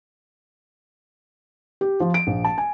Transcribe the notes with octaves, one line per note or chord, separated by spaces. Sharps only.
G4
F3
D7
A#1
A5
G#5